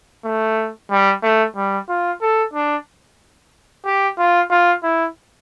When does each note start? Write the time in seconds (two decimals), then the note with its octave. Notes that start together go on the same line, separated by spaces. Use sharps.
0.25 A3
0.91 G3
1.23 A3
1.56 G3
1.89 F4
2.22 A4
2.54 D4
3.86 G4
4.18 F4
4.51 F4
4.83 E4